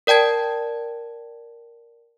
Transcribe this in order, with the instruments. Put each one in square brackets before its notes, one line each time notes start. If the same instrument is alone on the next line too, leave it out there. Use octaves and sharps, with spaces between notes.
[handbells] A#4 D5 G5 A5 G#6